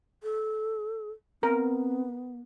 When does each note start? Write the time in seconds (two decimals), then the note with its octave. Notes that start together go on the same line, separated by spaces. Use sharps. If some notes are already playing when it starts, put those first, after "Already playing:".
0.23 A4
1.43 B3 C4 A#4